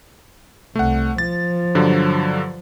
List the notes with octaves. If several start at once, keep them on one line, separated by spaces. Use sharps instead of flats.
C2 A3 F#5
F3 A6
G2 D3 F#3